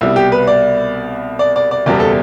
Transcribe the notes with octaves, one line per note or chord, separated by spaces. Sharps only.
C2 B2 G3 E4
G4
B4
D5
D5
D5
D5
F#1 E2 B2 G3 D5
A4